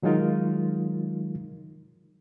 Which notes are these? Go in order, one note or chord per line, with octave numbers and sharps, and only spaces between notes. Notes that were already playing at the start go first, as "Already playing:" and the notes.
D#3 F#3 G#3 D#4 F4 A#4